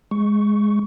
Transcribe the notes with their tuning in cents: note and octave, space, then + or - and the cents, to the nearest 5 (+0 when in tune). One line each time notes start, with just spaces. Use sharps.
G#3 +0 C#6 +0